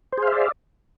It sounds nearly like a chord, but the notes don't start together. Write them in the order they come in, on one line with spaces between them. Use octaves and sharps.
C5 G#4 F5 E5 D5